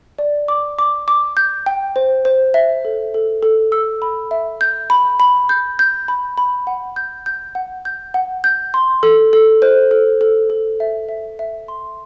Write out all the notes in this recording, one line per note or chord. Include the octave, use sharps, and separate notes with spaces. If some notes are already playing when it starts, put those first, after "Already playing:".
D5
D6
D6
D6
G6
G5
C5
C5
E5
A4
A4
A4
E6
B5
E5
G6
B5
B5
G6
G6
B5
B5
F#5
G6
G6
F#5
G6
F#5
G6
C6
A4
A4
C5
A4
A4
A4
E5
E5
E5
C6